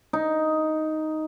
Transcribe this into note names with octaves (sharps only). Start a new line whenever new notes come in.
D#4